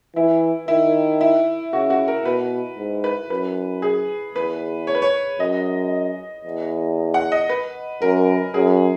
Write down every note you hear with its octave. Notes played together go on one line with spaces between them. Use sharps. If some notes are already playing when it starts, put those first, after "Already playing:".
E3 E4
D#3 E4
E4
C#3 F#4
F#4
A#4
B2 B4
G#2
B4
F#2 B4
G#4
E2 B4
C#5
B4
C#5
F#2 D#5
E2
F#5
D#5
B4
F#2 A#4
F#2 G#4